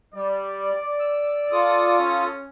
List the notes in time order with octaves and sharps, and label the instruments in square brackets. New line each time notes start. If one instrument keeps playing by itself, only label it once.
[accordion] G3 [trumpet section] D5
[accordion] E6
F4 A4 D#6
[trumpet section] C#4